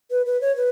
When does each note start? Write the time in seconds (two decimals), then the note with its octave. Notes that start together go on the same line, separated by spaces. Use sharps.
0.11 B4
0.26 B4
0.41 C#5
0.56 B4